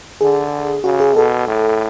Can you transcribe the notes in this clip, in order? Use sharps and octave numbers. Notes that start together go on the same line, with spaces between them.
D3 G#4
C#3 F#4
G#4
B2 A4
A2